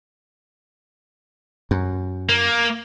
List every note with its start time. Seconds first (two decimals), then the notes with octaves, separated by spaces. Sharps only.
1.71 F#2
2.29 A#3